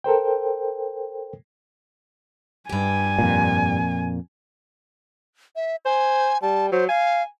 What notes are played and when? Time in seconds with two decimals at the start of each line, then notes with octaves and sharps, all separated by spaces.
0.04 A4 A#4 C5 G5
2.69 G2 G4 G#5
3.19 F2 A#2
5.56 E5
5.85 C5 G#5
6.42 G3 A5
6.72 F#3 C5
6.89 F5 G#5